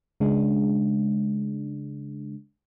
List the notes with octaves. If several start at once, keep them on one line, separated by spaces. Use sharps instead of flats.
C#3 G#3 D4